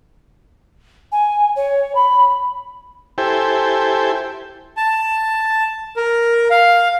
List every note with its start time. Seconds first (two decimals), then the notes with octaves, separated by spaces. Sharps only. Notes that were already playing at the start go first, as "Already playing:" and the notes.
1.12 G#5
1.56 C#5
1.95 B5
3.18 E4 G4 A4 C5 G5 G#5
4.77 A5
5.97 A#4
6.50 F5